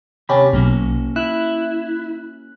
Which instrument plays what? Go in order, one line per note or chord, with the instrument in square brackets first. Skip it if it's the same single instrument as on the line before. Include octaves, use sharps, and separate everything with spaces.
[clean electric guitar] D#2 C3 A5 [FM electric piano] C#4 G4 B5
[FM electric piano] B1 [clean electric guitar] A#3 C#4 F#4
[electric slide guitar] E4 [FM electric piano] F#6